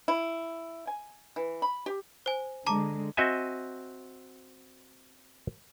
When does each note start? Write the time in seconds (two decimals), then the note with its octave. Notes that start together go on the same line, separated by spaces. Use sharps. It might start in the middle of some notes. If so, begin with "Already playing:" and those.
0.08 E4
0.87 G#5
1.36 E3
1.62 B5
1.86 G4
2.26 C5 G#5
2.66 D3 G#3 A5 A#5 D6
3.17 C4 F#4 D#5 E5 G#5